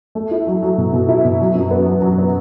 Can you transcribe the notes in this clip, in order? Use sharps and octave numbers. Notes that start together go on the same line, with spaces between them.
A3
E4
F#3
F#3
B2
B2
E4
B2
F#3
F#2
B3
F#3
F#3
B3